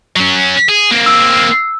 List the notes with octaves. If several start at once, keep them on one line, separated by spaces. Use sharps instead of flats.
F#3 C#4
G#4
A#3 C4
E6